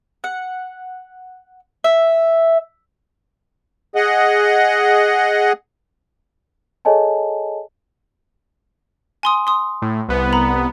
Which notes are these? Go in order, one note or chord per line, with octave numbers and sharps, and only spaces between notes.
F#5
E5
G#4 D#5 F#5
G#4 A4 C#5 D#5 G#5 A5
G#5 C6 D#6
C6 D#6
A2
C2 B3
A#5 B5